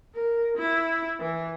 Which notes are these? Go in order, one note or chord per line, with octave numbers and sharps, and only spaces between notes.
A#4
E4
E3